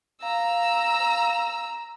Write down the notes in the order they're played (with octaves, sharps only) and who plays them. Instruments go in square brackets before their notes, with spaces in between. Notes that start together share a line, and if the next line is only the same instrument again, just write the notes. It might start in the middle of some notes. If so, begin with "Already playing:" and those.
[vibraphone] F5 [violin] A#5 E6